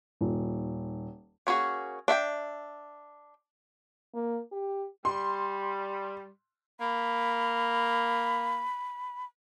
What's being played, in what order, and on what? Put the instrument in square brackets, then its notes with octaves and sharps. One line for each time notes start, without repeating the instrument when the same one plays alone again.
[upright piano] D#1
[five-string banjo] A#3 C#4 F#4 G#4
D4 E5 F#5 G5
[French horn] A#3
G4
[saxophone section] G3 [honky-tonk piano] C6
[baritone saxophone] A#3 [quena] B5